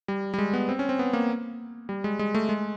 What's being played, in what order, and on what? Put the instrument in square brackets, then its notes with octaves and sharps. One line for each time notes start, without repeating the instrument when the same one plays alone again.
[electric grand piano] G3
G3
G#3
B3
C4
C#4
C4
B3
A#3
G3
G#3
G#3
A3
G#3